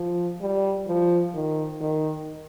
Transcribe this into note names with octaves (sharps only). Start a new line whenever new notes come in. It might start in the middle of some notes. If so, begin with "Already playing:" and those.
Already playing: F3
G3
F3
D#3
D#3